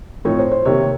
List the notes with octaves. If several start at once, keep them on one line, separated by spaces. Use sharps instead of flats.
A2 F3 C4 D#4 C#5
C5
C5
C3 D#3 A#3 C#5